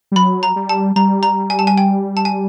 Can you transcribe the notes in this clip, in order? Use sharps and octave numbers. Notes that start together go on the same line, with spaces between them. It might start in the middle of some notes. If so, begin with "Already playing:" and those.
G3
F#3 B5
A#5
G3
A5
G3 A#5
A#5
G#5
A5
G#5
G5
A5
G#5